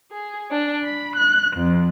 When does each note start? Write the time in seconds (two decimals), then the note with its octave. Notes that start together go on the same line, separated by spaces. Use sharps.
0.11 G#4
0.51 D4
0.85 B5
1.16 F#6
1.57 F2